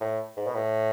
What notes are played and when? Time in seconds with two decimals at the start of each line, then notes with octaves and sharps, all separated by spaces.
0.01 A2
0.37 G#2
0.47 B2
0.55 A2